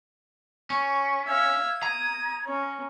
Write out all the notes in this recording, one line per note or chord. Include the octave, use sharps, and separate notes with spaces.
C#4 C#6
E5 F5 G#6
A#5 D#6
C#4 C#5